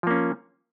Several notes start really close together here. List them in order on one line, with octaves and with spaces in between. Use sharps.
F3 A#3 C#4